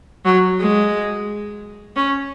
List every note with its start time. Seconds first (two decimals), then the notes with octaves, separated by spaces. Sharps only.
0.25 F#3
0.59 G#3
1.96 C#4